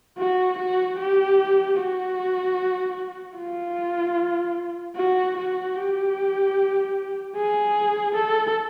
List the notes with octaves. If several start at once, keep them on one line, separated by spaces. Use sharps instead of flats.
F#4
F#4
G4
F#4
F4
F#4
F#4
G4
G#4
A4